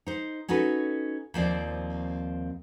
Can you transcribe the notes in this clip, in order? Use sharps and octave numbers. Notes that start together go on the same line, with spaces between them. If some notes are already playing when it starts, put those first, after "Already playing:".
D#4 C5
C#4 D#4 F#4 A4 B4
D#2 F3 C4 D5